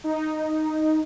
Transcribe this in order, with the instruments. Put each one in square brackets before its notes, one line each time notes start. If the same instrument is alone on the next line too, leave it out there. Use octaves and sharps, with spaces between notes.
[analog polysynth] D#4